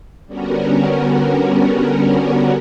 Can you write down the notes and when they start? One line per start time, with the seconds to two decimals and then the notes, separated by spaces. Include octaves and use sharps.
0.26 D3 G3 B3 C#4 F#4 A#4